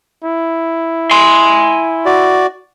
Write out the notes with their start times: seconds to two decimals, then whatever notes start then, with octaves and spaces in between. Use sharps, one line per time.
0.24 E4
1.11 G#5 C6
2.06 F#4 D5